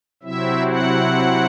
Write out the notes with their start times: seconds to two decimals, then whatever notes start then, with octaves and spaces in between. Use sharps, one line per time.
0.23 C3 F#3 C4 E4 E5
0.68 F#5